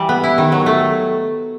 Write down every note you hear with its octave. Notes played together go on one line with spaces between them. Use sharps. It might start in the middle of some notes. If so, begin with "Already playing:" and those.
Already playing: E3 G3
B3
E4
D#3
F#3
A3